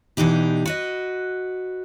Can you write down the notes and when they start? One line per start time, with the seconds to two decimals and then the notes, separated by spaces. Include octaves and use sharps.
0.17 B2 E3 D4 D#4 G4
0.66 F#4 B4 D#5